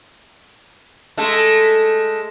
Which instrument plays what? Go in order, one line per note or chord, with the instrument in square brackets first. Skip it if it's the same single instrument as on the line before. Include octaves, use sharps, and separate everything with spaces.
[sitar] G#3 A3 A4